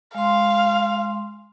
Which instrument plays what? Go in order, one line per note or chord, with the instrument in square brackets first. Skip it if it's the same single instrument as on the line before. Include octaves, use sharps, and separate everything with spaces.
[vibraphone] G#3 C6 [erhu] F5